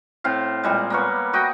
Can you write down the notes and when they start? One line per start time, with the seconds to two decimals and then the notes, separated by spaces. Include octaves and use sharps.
0.24 A2 C4 F5
0.64 A#2 G3 G#3
0.90 A#3 B3 C#5
1.33 F#4 D#5 G5